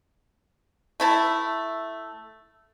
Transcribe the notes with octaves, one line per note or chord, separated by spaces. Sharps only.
A3 E4 A5